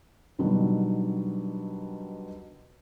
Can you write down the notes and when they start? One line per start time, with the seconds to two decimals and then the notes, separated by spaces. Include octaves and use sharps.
0.39 B2 D3 D#3 F#3 G3